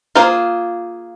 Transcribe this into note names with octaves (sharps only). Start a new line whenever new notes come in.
A#3 F4 G#4 C5